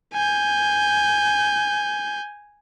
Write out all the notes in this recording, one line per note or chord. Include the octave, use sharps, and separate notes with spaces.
G#5 G6